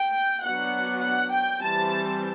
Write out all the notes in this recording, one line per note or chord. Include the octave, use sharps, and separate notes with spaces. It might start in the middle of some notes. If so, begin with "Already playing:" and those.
Already playing: G5
F#3 B3 D4 F#5
F#5
G5
E3 G3 C4 A5